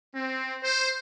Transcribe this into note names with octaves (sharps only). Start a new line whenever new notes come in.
C4
C5